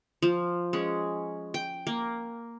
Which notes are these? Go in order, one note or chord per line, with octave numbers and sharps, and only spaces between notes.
F3
G#3 C#4
G5
A#3